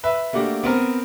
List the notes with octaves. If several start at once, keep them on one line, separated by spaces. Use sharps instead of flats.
B4 E5
A3 A#3 D4 F#4 G4
B3 C4 A#4